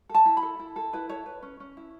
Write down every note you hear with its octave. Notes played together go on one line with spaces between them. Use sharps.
A4
A5
E4
B5
A4
E4
A4
E4 B4
A4 C#5
B4
C#4
C#4
E4